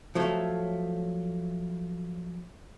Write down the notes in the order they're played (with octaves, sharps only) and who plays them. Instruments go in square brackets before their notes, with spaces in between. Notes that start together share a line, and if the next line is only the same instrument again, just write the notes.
[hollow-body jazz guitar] F3 F#3 A3